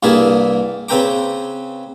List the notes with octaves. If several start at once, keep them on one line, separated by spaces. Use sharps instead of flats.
C2 G2 A#3 E4 G#4 E5
C#3 C4 B4 G5 A#5 D6